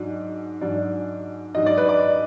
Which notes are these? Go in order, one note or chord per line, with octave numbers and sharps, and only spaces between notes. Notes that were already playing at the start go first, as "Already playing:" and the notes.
Already playing: G#2 F#3 D4
G#2 F#3 D4
G#2 F#3 D4 D#5
D5
B4
D5